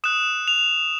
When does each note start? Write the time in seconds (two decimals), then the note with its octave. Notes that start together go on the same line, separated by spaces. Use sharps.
0.04 D#6 F#6 E7
0.48 F7